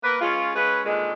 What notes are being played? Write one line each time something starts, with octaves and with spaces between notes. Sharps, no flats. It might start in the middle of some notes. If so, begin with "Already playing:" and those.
A#3 A#4 B4
G#3 C#4 F4
G#3 C#4 B4
A#2 D3 D#3 G#3